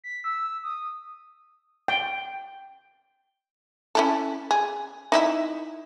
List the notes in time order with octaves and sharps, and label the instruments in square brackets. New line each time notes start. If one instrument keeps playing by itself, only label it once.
[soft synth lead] B6
E6
D#6
[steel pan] G5
[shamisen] C#4 E4 A4
G#4
D#4 E4 E5